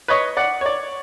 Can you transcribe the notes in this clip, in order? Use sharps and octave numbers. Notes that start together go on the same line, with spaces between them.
B4 C#5 D#5 C#6
D5 F#5
C#5 D5